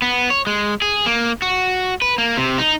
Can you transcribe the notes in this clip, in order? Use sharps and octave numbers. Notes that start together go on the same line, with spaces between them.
B3
C#5
G#3
G#4
A#3
F#4
B4
A#3
C3
D#4